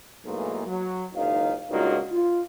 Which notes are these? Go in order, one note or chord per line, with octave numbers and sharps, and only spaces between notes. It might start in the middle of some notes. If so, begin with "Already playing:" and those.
B1 G#2 E3 A3 A#3
F#3
F#1 C#2 D#3 D#4 F5
C#2 G2 A#3 D#4 F4 F#4
F4